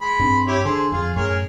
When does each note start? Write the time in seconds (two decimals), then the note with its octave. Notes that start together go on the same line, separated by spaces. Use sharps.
0.01 G#3 B5
0.19 G2 C4
0.47 E4 G4 C#5
0.65 D3 G#4 A4 C5
0.92 F2 F4 G#4
1.16 F#2 A2 G#4 A#4 C#5